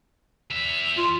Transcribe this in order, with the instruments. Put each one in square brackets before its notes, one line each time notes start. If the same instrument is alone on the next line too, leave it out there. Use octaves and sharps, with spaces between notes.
[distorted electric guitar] E2 E5
[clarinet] F4